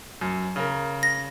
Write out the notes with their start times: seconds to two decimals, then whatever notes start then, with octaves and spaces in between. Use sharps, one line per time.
0.21 F#2
0.56 C#3 A#4
1.03 A#6